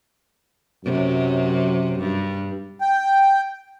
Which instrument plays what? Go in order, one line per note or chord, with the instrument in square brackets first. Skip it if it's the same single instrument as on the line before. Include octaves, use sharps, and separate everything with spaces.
[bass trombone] F#2 [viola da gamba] C3 F#3
[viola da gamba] G2
[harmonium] G5